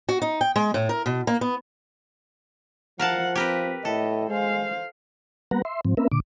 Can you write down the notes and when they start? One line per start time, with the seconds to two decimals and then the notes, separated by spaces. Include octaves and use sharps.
0.09 F#4
0.22 D#4
0.41 G5
0.56 G#3
0.74 A2
0.89 A#4
1.06 B2
1.27 A#3
1.41 B3
2.99 F3 A#4 F5 F#5 A5
3.35 C4 G4 A#4 B4
3.85 A2 A4 D#5
4.29 G#3 C5 F5
5.51 G3 A#3 B3 B4 F#5 A#5
5.65 E5 C6
5.85 G#2 F3 C4
5.97 A#3 C4 C#4 A#4 B4 E5
6.12 A#2 D3 D6